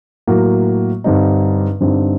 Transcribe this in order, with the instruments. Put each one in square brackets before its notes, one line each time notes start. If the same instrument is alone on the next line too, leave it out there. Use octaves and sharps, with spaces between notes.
[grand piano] A2 F#3 A#3
G2 D3 G3 C4 D#4
G2 D3 G3 C4 D#4